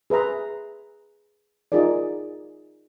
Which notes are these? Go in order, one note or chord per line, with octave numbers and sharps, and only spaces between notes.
G#4 B4 E5 A#5 C6
D#4 F4 G#4 A#4 D5